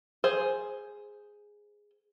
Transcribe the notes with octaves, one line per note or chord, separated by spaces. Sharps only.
G#4 C5